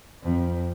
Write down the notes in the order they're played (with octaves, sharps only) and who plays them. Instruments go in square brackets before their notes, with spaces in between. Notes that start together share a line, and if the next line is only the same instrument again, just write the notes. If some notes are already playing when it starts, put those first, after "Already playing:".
[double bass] F2